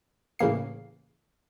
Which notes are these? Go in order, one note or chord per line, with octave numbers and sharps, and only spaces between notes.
A2 C#3 E3 A#3 C7